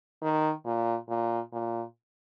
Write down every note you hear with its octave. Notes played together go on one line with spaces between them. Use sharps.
D#3
A#2
A#2
A#2